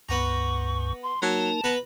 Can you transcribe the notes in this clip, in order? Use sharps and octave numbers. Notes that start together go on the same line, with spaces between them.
C#2 G2 B3 F#5 A#5 C#6
C6
F#3 A#3 D#4 A#4 A5
B3 B4 A#5 B5